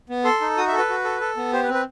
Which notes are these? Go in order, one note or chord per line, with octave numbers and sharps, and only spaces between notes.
B3
A4 C6
D#4
F#4 D#6
E5
A4
B4
F#4
A4
A4
B3
G4 C5
B4
C4
B4